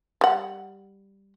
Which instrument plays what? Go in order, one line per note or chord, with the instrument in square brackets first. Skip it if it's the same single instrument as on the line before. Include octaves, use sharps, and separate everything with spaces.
[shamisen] G3 F#5